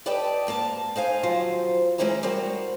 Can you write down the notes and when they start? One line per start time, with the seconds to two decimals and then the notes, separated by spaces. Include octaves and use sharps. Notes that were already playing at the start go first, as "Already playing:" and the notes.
0.06 G4 B4 D5 D#5 G5 A5
0.47 G#2 A#3 A4 A5
0.96 D#4 C5 F5 G#5
1.23 D#3 F3 F#3 F4 C5
1.98 E3 G#3 C#4 E4 C5 A#5
2.23 G3 F#4 A#4 C5 F#5